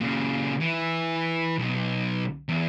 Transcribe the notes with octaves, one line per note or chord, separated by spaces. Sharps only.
A#2 C#3
E3
B1
E2